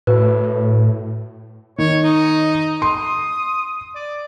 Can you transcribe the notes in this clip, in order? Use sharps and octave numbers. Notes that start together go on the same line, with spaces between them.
A2 F#4 B4
D#3 C#5
D#4
C6 D#6
D5